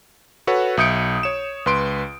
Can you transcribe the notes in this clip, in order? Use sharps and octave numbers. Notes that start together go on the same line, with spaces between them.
F#4 A4 B4 C#5 F#5
B1 E5 D#6 G6 C#7 D7
C#5 E7
C#2 B4 C6 D7